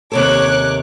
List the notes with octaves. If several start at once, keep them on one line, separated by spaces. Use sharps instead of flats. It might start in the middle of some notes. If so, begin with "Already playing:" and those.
D#2 C3 A4 C#5 D6 F#6